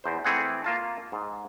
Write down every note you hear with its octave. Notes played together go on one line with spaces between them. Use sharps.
E2 C5
E3 A3 C4 G#4 F#5
A#3 F4 A5
G#2